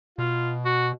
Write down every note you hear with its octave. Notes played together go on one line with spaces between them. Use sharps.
B2 F4
F#4